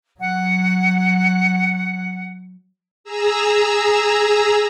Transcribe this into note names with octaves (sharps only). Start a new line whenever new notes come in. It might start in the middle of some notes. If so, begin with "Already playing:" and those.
F#3 F#5
G#4 A#5 E6